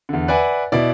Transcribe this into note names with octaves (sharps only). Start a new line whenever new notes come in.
E2 D3
B4 D5 E5 F#5 G#5
B2 E4 D5